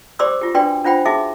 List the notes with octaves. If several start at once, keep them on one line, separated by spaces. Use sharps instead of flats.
G4 C5 D5 C6 D6 E6
F4 G4
D4 F#4 B4 D5 G5 C6
D4 F4 C5 F#5 G5 B5
D#4 F#4 G#4 E5 D6